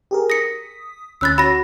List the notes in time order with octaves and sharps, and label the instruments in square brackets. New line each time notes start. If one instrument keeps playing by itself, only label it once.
[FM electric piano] G4 G#4 A#4
[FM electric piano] D#6 B6 [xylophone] A#6 C#7
[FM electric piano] D2 C#4 B5 [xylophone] E6 F#6 A6
[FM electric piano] F#4 C#5 [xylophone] B5 A#6